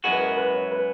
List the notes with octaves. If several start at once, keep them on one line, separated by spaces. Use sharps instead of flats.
F#2 E3 G#3 B3 F#4 G#4
B4
A#4
B4
C#5
B4